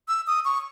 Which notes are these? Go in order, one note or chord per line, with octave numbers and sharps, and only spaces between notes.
E6
D#6
C#6